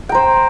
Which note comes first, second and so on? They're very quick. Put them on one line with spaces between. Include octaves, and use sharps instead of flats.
G5 A#5 C5